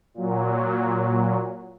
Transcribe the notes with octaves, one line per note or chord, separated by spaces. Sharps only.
A#2 F#3